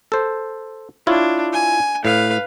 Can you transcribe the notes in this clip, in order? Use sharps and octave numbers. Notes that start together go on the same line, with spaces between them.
A4 C5
D4 E4 F4 C#5
G#5
A2 B4 F5